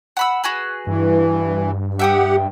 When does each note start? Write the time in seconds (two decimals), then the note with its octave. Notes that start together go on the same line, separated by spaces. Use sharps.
0.17 F#5 B5 E6
0.44 F#4 G#4 B4
0.87 G2 E3
1.99 G4 E5 F#5 G5 D#6